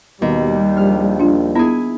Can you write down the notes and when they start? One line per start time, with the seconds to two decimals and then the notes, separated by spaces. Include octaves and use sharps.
0.22 D#2 B2 G3
0.77 A#1 F6
1.20 D4 F4
1.55 B3 E4 G#4